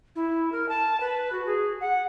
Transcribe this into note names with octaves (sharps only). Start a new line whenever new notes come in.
E4
A#4
A5
B4
F#4
G#4
F#5